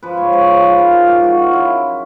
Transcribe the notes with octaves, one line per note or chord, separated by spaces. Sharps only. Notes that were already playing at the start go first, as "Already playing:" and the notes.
F3 B4
G#2 C#5
F3 C#5
F3 C5
F3 B4
F3 A#4
F3 G#4
G#2 G4
D#3 F#4
F#2 F4
D#3 E4